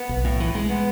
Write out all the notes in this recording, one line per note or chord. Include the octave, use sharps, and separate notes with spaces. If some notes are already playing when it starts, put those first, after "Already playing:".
Already playing: B3
B1
A2
E3
G#3
B3